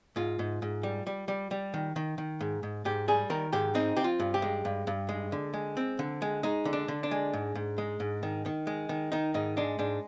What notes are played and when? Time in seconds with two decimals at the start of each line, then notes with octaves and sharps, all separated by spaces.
0.16 G#2 F4
0.39 G#2
0.62 G#2
0.83 G3
1.07 G3
1.28 G3
1.51 G3
1.74 D#3
1.96 D#3
2.18 D#3
2.41 G#2
2.63 G#2
2.85 G#2 G4
3.08 G3 G#4
3.30 D#3 A#4
3.53 G#2 G4
3.75 C4 D#4
3.97 C4 G4
4.04 F4
4.20 G2
4.34 G4
4.42 G#3
4.65 G2
4.87 G2
5.09 G#3
5.32 D3
5.54 G#3
5.77 C4
5.99 D3
6.22 G#3
6.43 G#3 D#4
6.65 D3
6.73 D4
6.88 D3
7.03 D4
7.11 G#3
7.33 G#2
7.55 G#2
7.78 G#3
8.00 G#2
8.23 D#3
8.46 D#3
8.67 G#3
8.89 D#3
9.12 D#3 D#4
9.34 G#2 D#4
9.57 G#3 D4
9.79 G#2 D4